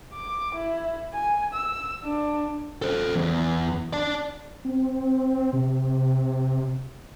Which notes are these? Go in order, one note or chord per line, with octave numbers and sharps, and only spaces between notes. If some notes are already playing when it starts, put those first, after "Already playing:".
D6
E4
G#5
E6
D4
A4 C5
E2
D5 A5
C4
C3